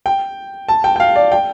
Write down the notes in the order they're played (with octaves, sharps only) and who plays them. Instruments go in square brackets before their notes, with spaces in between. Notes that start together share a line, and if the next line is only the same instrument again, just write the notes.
[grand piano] G5
A5
G5
G5
F5
D5
G5